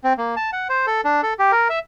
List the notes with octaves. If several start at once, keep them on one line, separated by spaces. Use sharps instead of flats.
C4
A#3
A5
F#5
C5
A4
D4
A4
G4
A#4
E5